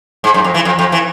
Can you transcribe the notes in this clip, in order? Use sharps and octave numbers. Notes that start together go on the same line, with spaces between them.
G#2
F#2
F2
E3
F2
F2
E3